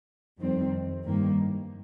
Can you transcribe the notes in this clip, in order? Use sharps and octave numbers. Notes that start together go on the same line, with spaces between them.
F2 D#3 G3 C4
G2 D#3 A#3